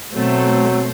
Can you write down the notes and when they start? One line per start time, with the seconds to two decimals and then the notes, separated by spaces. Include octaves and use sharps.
0.15 B2 F#3 A3 C4 C5